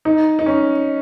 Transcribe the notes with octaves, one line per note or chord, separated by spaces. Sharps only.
D#4
D#4
C#4